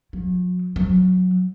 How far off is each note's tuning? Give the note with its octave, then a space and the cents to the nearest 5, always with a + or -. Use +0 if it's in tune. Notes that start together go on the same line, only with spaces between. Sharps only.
F#3 -40
F#3 -15